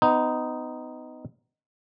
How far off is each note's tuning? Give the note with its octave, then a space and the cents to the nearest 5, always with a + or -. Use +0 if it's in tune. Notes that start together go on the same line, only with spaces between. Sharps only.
B3 +35 D#4 +0